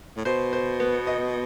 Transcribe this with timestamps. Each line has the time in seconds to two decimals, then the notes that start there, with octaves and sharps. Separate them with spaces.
0.17 A2
0.25 B2 C5
0.53 C5
0.80 B3
1.07 D#5